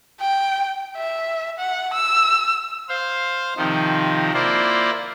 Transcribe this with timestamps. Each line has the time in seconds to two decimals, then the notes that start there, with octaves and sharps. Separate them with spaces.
0.20 G5
0.97 E5
1.59 F#5
1.94 E6
2.89 C5 F5
3.57 C3 D#3 F3 D#4
4.34 A#3 E4 F4 C5 D5